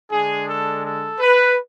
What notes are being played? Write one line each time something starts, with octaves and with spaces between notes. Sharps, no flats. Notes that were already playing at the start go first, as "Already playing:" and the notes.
D3 G#3 D4 G#4
A4
A4
B4